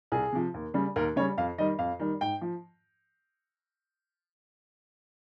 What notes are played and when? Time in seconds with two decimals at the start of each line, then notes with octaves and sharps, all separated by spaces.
0.12 C2 G#4
0.32 C3 F3
0.54 D#2
0.74 C#3 G3
0.96 D#2 A#4
1.16 C#3 G3 C#5
1.37 F2 F5
1.58 D#3 G3 D#5
1.79 F2 F5
1.99 D#3 G3
2.21 G#2 G5
2.41 F3